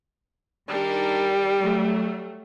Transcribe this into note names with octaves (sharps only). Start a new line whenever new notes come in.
D#3 G3 D4 A#4
F#3 A3